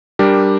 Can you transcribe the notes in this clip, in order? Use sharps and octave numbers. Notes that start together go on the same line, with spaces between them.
G3 D4 G4 A#4